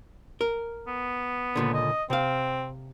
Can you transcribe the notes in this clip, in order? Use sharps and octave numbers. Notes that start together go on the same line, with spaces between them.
A#4
B3
C#2 A#2 D3
D#5
C3 C4 F5